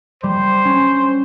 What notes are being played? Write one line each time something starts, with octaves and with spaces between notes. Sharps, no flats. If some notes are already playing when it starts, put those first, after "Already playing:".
G3 C5
C#4